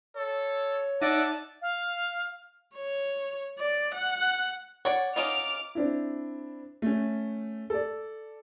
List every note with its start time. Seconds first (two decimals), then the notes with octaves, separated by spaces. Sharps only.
0.16 A4 C#5
1.02 D#4 D5 E5 F#5 A5 D6
1.62 F5
2.75 C#5
3.59 D5
3.94 F#5
4.85 C#5 D5 F#5
5.16 C#4 D#4 F4 D6 F6
5.75 C4 D4 E4
6.82 A3 C#4
7.70 A4 D5